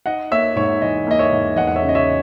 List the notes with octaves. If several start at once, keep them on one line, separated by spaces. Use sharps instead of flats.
D#4 D#5 F#5
A#3 C#5 E5
G#2 C#5
E3 D#5
A#3 D#5
C#5 E5
G#2
E2 D#5 F#5
F#5
C#5 E5
C#3
D#5
C#5 E5